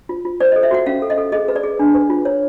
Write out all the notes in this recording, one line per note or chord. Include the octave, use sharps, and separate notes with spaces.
F4
F4
C5 D5
D#5
A4
E5
F#4 F#5
C#4 F5
A4
D#5
A4
G#4 D#5
B4
D5
G#4
D4
B4
F4
C#5